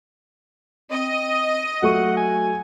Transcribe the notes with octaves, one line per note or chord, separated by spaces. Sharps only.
C4 D#5
F#3 A3 F#5 C#6
G#5